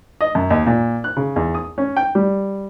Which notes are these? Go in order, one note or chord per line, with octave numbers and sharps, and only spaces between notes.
D#5
F#2
D#2
A#2
F#6
C#3
E2
D#6
C#4
G5
G3